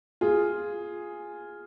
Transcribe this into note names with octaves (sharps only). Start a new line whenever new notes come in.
F4 G#4